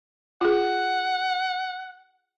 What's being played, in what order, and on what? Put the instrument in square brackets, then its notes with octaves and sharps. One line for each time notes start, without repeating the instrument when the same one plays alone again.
[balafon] F4 G#4 [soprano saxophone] F#5